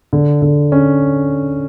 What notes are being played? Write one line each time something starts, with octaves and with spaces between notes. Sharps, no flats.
D3
D3
C#4